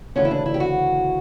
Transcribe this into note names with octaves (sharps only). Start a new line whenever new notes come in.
D2 C#3 E3 C#4
E4
D4
E4
G4
F#4